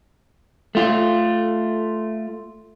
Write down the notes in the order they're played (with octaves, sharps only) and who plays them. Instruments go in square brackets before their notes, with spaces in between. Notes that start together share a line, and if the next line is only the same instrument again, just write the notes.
[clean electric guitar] A3 F4